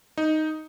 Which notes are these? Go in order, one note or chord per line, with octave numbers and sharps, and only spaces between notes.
D#4